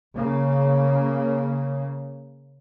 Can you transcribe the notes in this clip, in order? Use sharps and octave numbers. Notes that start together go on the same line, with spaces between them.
C#3 A#3